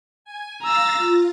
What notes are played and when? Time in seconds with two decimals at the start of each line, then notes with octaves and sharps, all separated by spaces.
0.25 G#5
0.63 F5 A#5 E6 A6 A#6
0.95 F4